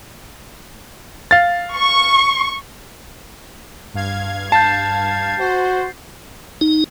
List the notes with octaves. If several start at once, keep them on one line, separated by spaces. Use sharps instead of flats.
F5 A6
C#6
G2 F5 G#6
A5 G6 A6 C7
F#4 C5
D#4